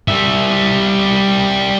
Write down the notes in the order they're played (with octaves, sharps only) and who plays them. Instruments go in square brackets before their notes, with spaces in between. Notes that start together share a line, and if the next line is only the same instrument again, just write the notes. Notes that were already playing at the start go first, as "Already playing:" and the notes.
[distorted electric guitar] G3 E5